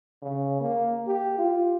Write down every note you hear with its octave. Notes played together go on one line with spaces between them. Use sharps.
C#3
A#3
G4
F4